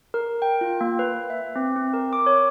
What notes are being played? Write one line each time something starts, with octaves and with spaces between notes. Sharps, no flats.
A#4
G5
F4
A#3
B4
E5
C4
C4
A#4
D6
C#5